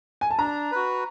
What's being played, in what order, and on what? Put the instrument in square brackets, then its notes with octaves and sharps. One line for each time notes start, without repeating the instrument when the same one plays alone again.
[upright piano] G#5
A5
[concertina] D4 [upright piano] A#5
[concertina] F#4 B4